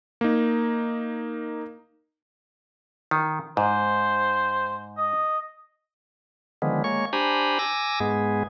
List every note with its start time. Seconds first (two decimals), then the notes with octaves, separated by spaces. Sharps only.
0.21 A#3 D#4
3.11 D#3
3.57 G#2 C5
4.98 D#5
6.62 D3 D#3 F3 G#3 B3
6.84 G#3 A#3 C#5 C#6
7.13 D4 G4 C5 G#5 A#5 B5
7.59 G#5 D6 E6 A#6
8.00 G#2 G#3 B3 G#4